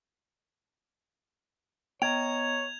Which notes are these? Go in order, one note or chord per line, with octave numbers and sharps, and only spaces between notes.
B3 C#5 D#5 G5 A#5 G#6 F7